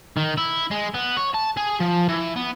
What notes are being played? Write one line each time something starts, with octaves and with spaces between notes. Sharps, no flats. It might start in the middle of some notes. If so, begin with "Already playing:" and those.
D#3
E4
G#3
B3
C#5
A5
G#4
F3
E3
B3